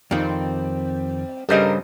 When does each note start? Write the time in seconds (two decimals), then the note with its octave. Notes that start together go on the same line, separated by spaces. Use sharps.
0.11 F2 D#3 G3 C4
1.49 G2 C#3 G3 A4 A#4 C5 D#5